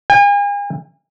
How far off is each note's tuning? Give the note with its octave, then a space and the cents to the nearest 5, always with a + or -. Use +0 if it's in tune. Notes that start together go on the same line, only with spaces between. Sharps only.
G#5 -40